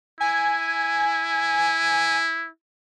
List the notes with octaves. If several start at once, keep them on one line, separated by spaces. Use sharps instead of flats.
E4 G#5